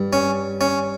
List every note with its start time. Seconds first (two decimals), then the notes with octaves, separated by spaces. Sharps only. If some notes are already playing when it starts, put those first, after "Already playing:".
Already playing: G2
0.13 C#4
0.61 C#4